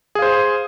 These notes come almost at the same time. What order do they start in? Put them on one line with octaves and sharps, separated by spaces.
G#4 F5 C5